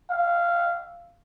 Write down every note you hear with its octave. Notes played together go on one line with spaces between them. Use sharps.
F5